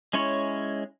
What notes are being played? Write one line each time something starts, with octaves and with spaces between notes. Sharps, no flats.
G#3 C#4 E4 C#5